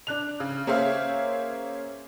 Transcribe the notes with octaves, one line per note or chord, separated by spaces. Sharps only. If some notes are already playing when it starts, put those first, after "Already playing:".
D4 F#6 F7
C#3
A#3 C#4 G#4 C5 E5 F5